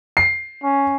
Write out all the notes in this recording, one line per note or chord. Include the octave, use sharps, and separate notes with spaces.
C7
C#4